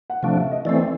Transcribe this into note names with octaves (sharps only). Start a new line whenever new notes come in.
F#5
C3 F3 A3 D4 F5
E5
D#5
E3 A3 C4 D5